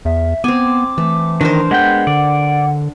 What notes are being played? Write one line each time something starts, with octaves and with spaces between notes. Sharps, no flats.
E2 E5
B3 C4 G#5 D6
E3 A3
D#3 D4 A#4 C5
G#3 B3 F#5 G5
D3 D5